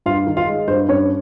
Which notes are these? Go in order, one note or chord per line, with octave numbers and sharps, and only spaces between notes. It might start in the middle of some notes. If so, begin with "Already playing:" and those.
G2 F4 F5
D#3
F4 F5
G#3
G2 C5
G2 C#4 C#5